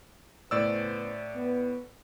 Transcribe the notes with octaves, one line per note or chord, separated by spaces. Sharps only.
A2 C#3 B3 C5 D5 E6
B3